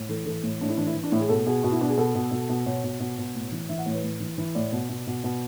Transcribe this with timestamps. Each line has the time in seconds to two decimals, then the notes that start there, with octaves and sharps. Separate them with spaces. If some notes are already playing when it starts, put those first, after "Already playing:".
Already playing: A2
0.09 E3 A4
0.26 E3 A4
0.43 A2
0.61 A2 D4
0.69 E4
0.77 E3 D4
0.86 E4
0.95 E3
1.03 D4
1.12 A2 E4
1.20 G#4
1.29 B2 A4
1.46 B2 G#4
1.63 B2 F#4
1.71 E4
1.81 B2 D4
1.89 G#4
1.97 B2 A4
2.15 B2
2.31 B2
2.49 B2
2.66 B2 C#5
2.84 B2
3.00 B2
3.18 B2
3.35 A2
3.52 E3
3.69 E3 E5
3.78 F#5
3.86 A2 C#5
3.95 B4
4.04 A2
4.20 E3
4.38 E3
4.55 A2 D5
4.72 B2
4.89 B2
5.07 B2
5.24 B2